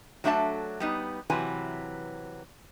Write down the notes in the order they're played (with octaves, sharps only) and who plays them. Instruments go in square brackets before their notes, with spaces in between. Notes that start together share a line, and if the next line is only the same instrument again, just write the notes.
[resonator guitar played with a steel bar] F#3 A3 D4 A4 E5 A5
G3 B3 D#4
C3 E3 F#3 B4 G#5